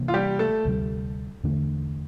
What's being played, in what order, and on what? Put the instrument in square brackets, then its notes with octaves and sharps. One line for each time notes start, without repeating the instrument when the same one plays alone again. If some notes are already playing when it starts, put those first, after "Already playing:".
Already playing: [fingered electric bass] C3 E3 A#3 D4
[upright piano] F4
G3 G4
A3 A4
[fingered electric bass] D2 C3 G3
E2 D3 A3 D4